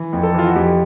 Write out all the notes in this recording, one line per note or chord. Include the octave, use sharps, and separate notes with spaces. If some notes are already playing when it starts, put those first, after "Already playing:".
Already playing: E3
F2
A4
E3 F4
F#4
F2 G4